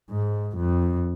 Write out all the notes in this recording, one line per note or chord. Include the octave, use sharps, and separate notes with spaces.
G#2
F2